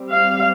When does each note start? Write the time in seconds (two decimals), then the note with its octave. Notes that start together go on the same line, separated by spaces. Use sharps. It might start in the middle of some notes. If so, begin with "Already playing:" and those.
Already playing: G3 C4
0.12 F5